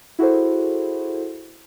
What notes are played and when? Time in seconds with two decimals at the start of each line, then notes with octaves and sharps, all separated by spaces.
0.19 E4 F#4 G#4 A4 C5